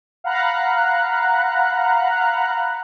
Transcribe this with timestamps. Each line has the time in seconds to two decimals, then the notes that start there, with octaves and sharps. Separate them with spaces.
0.24 F5 F#5 A#5 B5 F#6